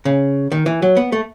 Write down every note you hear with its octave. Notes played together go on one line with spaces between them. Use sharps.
C#3
D#3
E3
F#3
B3
A3